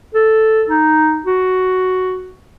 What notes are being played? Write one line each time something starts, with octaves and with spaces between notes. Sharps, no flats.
A4
D#4
F#4